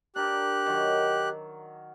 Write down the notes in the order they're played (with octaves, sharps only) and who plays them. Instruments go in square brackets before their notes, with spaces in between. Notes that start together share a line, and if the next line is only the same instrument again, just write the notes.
[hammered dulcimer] D4 A#4 [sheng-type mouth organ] G4 F#6
[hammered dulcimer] D#3 F#3